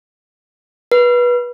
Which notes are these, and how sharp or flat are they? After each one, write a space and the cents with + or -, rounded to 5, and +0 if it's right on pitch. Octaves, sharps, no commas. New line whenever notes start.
B4 -20